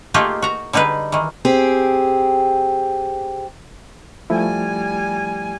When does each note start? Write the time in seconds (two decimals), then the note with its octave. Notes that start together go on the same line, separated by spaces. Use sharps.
0.14 A3 A#3 D#4 F4 G4 G#4
0.42 F#4 A#5
0.73 D3 G3 D#4 G#4 B4
1.12 D#3 E3
1.45 C4 G4 G#4
4.30 F3 G3 A3 E4 G#5